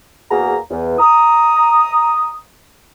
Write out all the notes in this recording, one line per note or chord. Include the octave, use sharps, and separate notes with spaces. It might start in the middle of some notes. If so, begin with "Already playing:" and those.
E2 A#3 F#4 G#4 A#5
E2
A#5 D#6